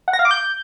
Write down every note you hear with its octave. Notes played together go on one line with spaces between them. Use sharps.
F#5
A#6
F5
D6
G6